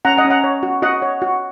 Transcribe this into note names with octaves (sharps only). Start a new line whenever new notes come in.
C#4 F#5 A#5
D#5 F#5
C#4
F#5 A#5
C#5
F#4
F#4 D#5 F#5
C#5
F#4